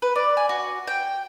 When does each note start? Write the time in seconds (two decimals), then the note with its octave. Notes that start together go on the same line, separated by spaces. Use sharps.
0.02 B4
0.16 D5
0.37 G#5
0.49 F#4
0.87 G5